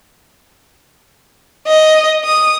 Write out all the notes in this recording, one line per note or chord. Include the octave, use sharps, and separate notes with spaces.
D#5
D#6